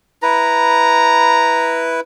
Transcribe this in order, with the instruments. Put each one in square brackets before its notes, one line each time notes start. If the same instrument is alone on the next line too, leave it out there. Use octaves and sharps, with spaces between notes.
[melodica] E4 B4 [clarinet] A#5